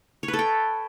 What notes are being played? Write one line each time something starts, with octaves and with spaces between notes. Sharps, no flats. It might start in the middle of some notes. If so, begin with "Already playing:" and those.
C#5
B4
A4
G5